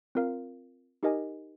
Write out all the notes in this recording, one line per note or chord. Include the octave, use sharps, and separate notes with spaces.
C4 F4 A#4 F5
D#4 G4 A#4 D#5 G#5